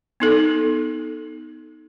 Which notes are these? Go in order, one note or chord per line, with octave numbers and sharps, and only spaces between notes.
B3 D#4 A4